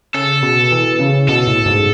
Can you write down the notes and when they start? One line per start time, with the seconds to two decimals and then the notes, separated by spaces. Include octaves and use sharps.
0.14 C#3 A4
0.43 B2
0.72 E3
0.99 C#3
1.28 B2 A4
1.47 A2
1.66 G#2